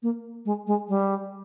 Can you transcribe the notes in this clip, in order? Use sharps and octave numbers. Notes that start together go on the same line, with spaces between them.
A#3
G#3
G#3
G3